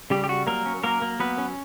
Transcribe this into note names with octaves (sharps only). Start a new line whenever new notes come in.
C#3 G3 G4
G4
G3 F#4
F#3 A#3 A#4
C#4
F#3 A#3 A#4
A#3
F#3 B3 B4
C#4